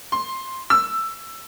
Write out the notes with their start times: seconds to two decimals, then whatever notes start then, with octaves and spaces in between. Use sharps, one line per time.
0.12 C6
0.70 E6